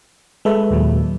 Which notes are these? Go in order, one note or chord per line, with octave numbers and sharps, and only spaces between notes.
G#3 A4 B4 E5
D#2 A#2 F#3